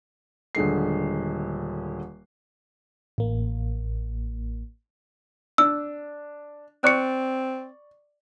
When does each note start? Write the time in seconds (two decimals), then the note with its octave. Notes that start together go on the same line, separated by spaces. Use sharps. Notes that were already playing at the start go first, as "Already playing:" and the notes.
0.55 D#1 D3 G#3 C7
3.18 A1 A#3
5.58 D4 E6
6.84 C4 D5 C#6 F#6 C#7